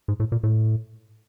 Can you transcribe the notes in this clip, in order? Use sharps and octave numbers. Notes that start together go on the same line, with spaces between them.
G#2
A2
A#2
A2